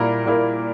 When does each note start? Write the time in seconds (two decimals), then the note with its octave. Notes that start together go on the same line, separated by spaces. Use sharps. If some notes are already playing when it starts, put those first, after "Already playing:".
Already playing: A#2 G3 A#3 E4 A#4
0.26 A#2 G3 A#3 E4 A#4